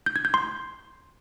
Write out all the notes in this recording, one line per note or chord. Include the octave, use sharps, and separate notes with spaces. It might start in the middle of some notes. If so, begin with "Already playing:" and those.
G6
G#6
G6
C6